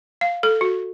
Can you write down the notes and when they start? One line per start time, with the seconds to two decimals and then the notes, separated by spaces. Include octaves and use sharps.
0.21 F5
0.43 A4
0.61 F#4